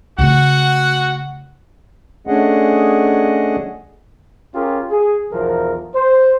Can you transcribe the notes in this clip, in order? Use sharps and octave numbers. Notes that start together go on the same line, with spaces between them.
C#3 A3 F#4 F#5
A3 C#4 D4 G#4 D#5 F#5
C#4 F4 G4 G#4 A#4
G#4
B1 E2 F3 A#4
C5